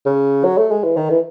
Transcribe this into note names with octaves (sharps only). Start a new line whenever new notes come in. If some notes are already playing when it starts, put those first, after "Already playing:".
C#3
F#3
A3
G#3
E3
D#3
E3